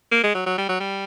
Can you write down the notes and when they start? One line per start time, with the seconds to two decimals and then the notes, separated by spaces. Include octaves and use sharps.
0.12 A#3
0.23 G#3
0.34 F#3
0.46 F#3
0.58 G3
0.69 F#3
0.80 G3